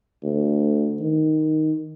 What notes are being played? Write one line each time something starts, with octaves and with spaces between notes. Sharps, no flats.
D2
D#3